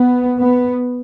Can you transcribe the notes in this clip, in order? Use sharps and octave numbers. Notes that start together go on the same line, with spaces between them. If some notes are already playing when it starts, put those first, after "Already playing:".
Already playing: B3
B3